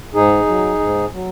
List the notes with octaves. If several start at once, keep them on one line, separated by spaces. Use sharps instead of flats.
G#2 D#4 G#4
F#3
G#2
F#3